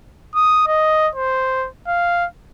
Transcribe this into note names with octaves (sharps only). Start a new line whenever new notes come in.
D#6
D#5
C5
F5